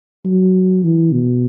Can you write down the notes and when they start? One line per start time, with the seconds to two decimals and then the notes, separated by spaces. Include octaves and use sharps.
0.25 F#3
0.84 E3
1.13 B2